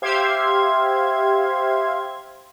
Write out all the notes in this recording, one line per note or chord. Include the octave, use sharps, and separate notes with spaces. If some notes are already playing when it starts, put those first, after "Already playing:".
G4 C5 E5 F5 C6 G#6